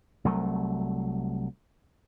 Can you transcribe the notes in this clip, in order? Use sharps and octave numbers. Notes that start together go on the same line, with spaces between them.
C2 F#3 A3